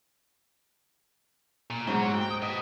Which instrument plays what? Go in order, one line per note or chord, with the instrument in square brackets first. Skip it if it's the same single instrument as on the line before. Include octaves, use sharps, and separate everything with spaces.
[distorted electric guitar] A#2
[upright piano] G#2 [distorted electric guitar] F#3 F#4 [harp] C4 G4 A#5
[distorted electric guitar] G5
[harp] G4 [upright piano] D#6
[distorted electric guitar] B4 D#5